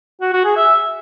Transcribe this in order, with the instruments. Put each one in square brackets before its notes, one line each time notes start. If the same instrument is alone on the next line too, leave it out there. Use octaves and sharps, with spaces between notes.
[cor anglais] F#4
F#4
G#4
E5